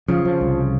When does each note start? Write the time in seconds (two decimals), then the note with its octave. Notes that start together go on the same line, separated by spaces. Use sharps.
0.08 C#3 F3
0.25 F3
0.41 C2